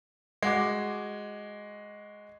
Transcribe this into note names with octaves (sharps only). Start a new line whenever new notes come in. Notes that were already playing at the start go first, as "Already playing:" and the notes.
G#3 F#4 D6